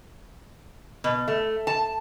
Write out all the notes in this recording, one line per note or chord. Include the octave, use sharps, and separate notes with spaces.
B2
A3
A5